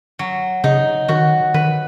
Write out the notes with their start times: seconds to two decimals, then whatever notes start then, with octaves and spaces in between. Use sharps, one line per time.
0.19 F#3
0.64 C#3 D#4
1.08 D#3 F#4
1.54 D#3 B4